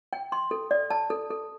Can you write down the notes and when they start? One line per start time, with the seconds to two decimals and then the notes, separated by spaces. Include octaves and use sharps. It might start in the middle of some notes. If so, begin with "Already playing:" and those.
0.13 G5
0.32 C6
0.51 A4
0.71 D5
0.90 A5
1.10 A4
1.30 A4